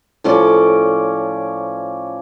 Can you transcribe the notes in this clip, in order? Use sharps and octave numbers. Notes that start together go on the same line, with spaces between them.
A2 F3 C#4 D5